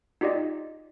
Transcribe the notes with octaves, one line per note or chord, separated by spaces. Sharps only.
D#4 F4 G4 D5 D#5